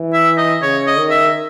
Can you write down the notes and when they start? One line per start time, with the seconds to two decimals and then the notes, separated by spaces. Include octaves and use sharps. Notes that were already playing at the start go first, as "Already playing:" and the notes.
Already playing: E3
0.13 E5
0.37 D#5
0.62 C#3 C#5
0.87 D#5
0.98 D#3
1.10 E5